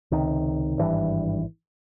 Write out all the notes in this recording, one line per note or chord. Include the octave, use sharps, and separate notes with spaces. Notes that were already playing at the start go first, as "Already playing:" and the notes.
C#2 C3 D#3
G#1 G2 E3